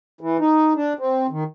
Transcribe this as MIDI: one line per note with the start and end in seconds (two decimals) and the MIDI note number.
0.21 0.37 52
0.39 0.73 63
0.76 0.93 62
0.99 1.27 60
1.30 1.44 51